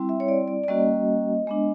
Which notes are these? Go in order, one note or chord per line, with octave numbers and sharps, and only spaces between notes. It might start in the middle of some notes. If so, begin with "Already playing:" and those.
Already playing: G3 C4 E4
E5
C#5
D5
D5
D5
G3 A#3 C#4 F#4 D#5
G#3 B3 D4